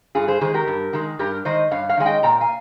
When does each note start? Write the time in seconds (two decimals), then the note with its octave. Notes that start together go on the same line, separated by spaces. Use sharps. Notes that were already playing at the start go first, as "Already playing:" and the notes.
0.15 G2 F4 G#4
0.28 G#4 C5
0.40 D#3 G#3 G#4 C5
0.54 G4 A#4
0.68 G2
0.93 D#3 G#3
1.19 G2 G4 A#4
1.45 D#3 G#3 C5 D#5
1.71 G2 C#5 F5
1.89 C#5 F5
1.97 D#3 G#3 G#5
2.06 D#5 G5
2.23 A#2 G5 A#5
2.41 F5 G#5